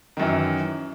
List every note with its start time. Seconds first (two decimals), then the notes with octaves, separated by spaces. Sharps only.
0.17 D#3
0.20 F#2
0.22 E3